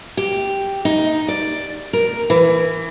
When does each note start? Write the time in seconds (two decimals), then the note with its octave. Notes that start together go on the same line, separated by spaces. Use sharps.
0.17 G4
0.85 D#4
1.28 D5
1.93 A#4
2.30 E3